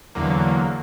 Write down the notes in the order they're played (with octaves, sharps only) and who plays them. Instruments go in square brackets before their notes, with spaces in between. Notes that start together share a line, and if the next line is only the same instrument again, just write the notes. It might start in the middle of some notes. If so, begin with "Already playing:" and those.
[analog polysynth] E2 D3 F#3 A#3